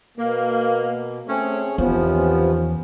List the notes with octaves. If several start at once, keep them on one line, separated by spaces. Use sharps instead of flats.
B2 A#3
A3 C4 C#4 G#4 C#5
E2 C3 D#3 F3 B3 C#4